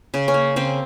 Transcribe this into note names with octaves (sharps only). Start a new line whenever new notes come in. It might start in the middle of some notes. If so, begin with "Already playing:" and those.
C#3
C#4
A#3
C#3 C4